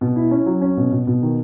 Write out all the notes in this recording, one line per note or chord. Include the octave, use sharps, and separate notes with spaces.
B2
E4
C#4
F#3
C#4
B2
B2
B2
D#3